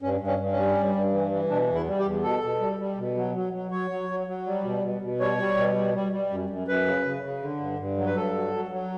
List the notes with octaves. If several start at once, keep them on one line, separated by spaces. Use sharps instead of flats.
G2 C#4
G2
C#4
G2
G3 C#4
G2
G2
E3
E3
B2 D4
E2
E4
G3
G4
E2
B2 A4
B2
G3
G3
B2
F#3
F#3
F#3
F#3 C#5
F#3
F#3
F#3
G3
B2
B2
B2
G3 C#5
G3
B2
G3
G3
G3
F#2
F#2
F#2 B4
C#3
C#3
C#3
D3
G2
G2
F#3
B4
G2 A4
F#3
F#3
F#3